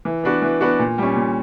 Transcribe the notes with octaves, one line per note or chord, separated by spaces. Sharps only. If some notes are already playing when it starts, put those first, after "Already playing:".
E3
B3 D4 F#4 B4
E3
B3 D4 F#4 B4
A#2
G3 C#4
A#2